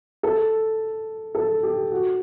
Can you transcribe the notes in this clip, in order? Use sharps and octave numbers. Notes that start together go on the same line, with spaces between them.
A4
A4
G4
F#4